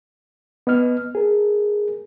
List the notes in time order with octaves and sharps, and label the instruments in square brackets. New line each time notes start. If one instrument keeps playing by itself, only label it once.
[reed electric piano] B3 D#5 F6
G#4 A#4